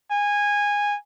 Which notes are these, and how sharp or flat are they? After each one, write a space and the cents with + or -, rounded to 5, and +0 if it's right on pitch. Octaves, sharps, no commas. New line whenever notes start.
G#5 -15